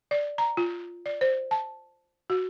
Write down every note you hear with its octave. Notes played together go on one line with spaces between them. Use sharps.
D5
A#5
F4
D5
C5
A5
F#4